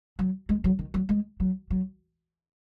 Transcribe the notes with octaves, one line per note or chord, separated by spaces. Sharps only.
F#3
G#3
F#3
D#3
F#3
G#3
F#3
F#3